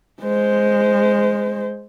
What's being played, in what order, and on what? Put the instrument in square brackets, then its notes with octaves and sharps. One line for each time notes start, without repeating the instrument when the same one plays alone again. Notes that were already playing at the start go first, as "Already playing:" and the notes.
[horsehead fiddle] G#3 C5